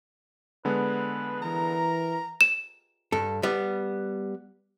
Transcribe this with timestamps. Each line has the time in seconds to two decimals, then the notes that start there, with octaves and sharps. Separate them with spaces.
0.65 D3 G#3 B3 B4
1.42 E3 A#4 A#5
2.41 E7
3.12 G2 A4
3.43 G3 B3